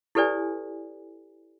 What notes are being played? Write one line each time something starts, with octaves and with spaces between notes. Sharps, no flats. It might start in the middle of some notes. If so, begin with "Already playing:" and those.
E4 G4 A4 B4 D5 G#5